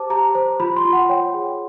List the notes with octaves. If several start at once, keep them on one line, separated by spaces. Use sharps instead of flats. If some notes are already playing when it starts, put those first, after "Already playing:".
Already playing: G4 C5 A5 D6
G4 A#5
C5
F4 B5
C6
F4
F#5
C#5 G5
G#4